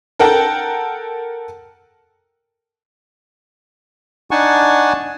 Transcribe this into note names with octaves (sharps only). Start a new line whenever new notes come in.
A4 A#4 F#5 G5 A5
D4 D#4 F#5 G#5 A5 C#6